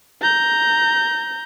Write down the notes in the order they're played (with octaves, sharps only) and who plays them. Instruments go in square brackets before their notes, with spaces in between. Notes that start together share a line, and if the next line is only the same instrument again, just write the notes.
[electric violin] A#5 G6